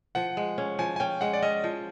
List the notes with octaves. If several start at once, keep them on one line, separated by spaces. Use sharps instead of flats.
F3 F#5
G#3
C#4
F3 G#5
G#5
C#4 G5
G#3 F#5
D5
C#4 D#5
F3